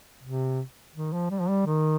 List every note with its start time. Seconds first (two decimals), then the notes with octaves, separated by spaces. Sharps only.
0.24 C3
0.95 D#3
1.13 F3
1.30 G3
1.40 F3
1.49 G3
1.66 D#3